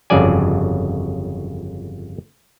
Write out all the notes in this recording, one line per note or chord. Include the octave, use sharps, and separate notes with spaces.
G1 F2 C#3 F#3 D5 G#5